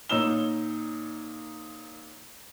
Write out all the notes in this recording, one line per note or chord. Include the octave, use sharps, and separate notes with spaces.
A#2 D#4 C#5 E6 E7 G7